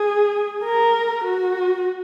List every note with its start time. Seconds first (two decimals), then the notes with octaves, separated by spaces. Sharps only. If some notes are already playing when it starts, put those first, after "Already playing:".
Already playing: G#4
0.64 A#4
1.24 F#4